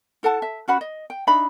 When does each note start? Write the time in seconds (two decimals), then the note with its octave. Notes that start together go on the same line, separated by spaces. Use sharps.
0.23 E4 A4 F#5 A5
0.42 E5
0.68 C#4 F#4 F#5 B5
0.81 D#5
1.10 G5
1.27 D4 D#4 E5 B5